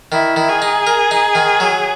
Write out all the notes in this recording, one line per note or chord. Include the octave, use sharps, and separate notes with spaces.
D#3 E4
D#3
G#4
D#4
A#4
D#4
D#3
F#3